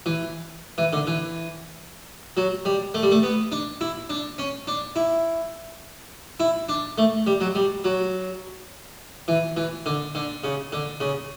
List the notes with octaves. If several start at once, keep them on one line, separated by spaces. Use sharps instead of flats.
E3
E3
D3
E3
F#3
G3
A3
G3
A3
B3
D4
E4
D4
C#4
D4
E4
E4
D4
A3
G3
F#3
G3
F#3
E3
E3
D3
D3
C#3
D3
C#3